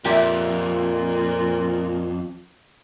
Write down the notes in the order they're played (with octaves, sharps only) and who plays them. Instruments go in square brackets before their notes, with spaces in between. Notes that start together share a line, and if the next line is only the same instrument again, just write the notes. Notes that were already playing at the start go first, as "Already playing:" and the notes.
[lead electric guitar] F2 [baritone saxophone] A#2 [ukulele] G4 E5